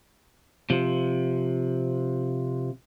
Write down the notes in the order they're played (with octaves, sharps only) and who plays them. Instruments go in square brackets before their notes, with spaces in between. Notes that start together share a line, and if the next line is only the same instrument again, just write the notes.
[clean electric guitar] C3 F3